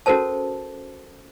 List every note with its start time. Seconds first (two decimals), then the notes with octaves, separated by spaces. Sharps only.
0.06 C#4 F#4 A4 A#4 C5 A5